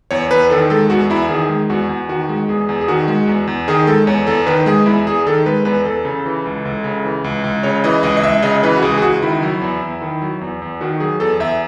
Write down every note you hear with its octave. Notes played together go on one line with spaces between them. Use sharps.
E2 C#5
E2 B4
D#3 A4
G#3 A4
E2 F#4
E2 E4
D#3 G#4
G#3
E2 F#4
E2
D#3 F#4
G#3
E2 G#4
E2
G#4
D#3 F#4
G#3
E2
E2
D#3 G#4
G#3 A4
E2 C#5
E2 A4
D#3 B4
G#3 G#4
E2 E4
E2 G#4
D#3 A4
G#3 B4
E2 B4
E2 A4
C#3
E3
C#2
C#2
C#3
E3
C#2
C#2
C#3 C#5
E3 D#5
C#2 D#5
D#5
C#2 E5
C#3 D#5
E3 B4
F#4
C#2 G#4
G#4
C#2 F#4
D#3 E4
F#3
E2
E2
D#3
F#3
E2
E2
D#3 F#4
F#3 G#4
E2 A4
E2 E5